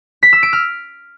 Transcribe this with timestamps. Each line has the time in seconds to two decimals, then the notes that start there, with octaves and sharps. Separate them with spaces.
0.23 B6
0.33 E6
0.43 D7
0.53 F6